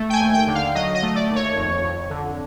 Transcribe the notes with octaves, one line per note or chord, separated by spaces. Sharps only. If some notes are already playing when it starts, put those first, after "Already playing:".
Already playing: A3
G5
G#5
D#2
G5
D3
F5
F#3 D#5
D#5
A3
D5
D#2
C#5
F2
F2
D3